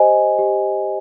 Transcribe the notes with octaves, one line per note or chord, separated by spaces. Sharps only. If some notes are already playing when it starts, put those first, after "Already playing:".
Already playing: G4 C5 D#5 G#5
G4